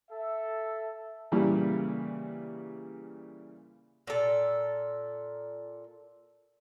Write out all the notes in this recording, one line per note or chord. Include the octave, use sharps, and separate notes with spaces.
A4 E5
A#2 C#3 E3 G3
A#2 A4